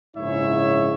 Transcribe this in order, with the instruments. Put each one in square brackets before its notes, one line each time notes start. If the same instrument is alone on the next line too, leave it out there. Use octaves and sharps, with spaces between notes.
[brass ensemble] A#1 G#2 C#3 E4 C#5 E5